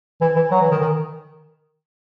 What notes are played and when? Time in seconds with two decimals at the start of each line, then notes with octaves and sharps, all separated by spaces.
0.21 E3
0.36 E3
0.51 F#3
0.61 E3
0.71 D#3
0.81 D#3